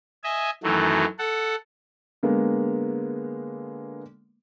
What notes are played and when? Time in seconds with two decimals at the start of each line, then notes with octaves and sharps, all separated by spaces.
0.24 D#5 E5 G#5
0.63 F#2 D#3 E3 F#3 A3
1.19 A4 F#5
2.23 D3 G#3 A#3 B3